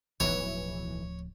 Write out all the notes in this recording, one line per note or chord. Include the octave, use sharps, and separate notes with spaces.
D1 B1 E3 F3 C#5